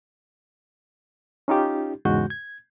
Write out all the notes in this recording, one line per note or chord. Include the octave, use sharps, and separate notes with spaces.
C#4 D#4 F4 G4
E2 G#2 C#3 G#3 F#4 G6
G#6